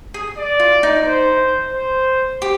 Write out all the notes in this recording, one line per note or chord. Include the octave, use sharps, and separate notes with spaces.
G#4
D5
F4
D#4
C5
C5
G4